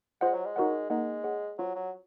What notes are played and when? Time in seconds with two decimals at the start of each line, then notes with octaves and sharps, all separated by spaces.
0.21 G#3 F4 C5 D#5 F#5
0.34 F#3
0.46 G#3
0.56 D#4 F#4 A#4 C#5 F#5
0.90 G#3 A#3 D#4 A#4 D#5 F#5
1.24 G#4 C#5 F#5
1.59 F#3 C#4 F4 C5 F#5
1.75 F#3